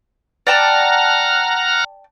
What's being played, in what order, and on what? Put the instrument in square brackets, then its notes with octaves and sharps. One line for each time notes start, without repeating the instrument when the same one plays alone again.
[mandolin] D5 G5 A5 [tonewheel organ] F#5 A#5 F6